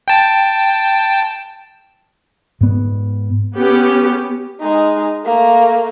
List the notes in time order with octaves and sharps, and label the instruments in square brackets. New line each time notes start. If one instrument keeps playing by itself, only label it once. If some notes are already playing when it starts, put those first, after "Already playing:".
[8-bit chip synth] G5 A5
[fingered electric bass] G#2 B3
[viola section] B3 C#4 G4
[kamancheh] G#3 D#4
A3 A#3